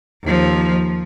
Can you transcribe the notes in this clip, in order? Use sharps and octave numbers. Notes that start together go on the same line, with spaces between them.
D#2 F3